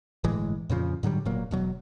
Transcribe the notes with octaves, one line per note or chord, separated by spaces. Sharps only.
G1 A2 E3 G#3
F2 A#2 C#3 F3
G#2 D3 F#3 G3
E1 A#2 F#3 A#3
E1 B2 F#3